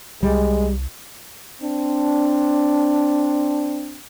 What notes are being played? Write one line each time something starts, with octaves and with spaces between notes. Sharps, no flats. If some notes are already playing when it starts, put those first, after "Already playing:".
C2 G3 G#3
C4 D4